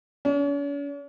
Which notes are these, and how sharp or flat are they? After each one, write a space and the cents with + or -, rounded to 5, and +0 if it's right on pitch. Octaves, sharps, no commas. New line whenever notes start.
C#4 +45